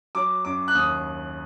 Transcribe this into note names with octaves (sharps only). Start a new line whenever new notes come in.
F#3 D6
F#2 D6
F#6
D#2 D#6